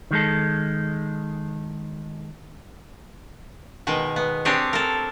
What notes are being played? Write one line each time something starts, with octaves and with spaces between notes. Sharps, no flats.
D#3 G#3 A4
B2 D#3 G#3
B3
C4 D4 G4 G#4 C#5
A4 A#4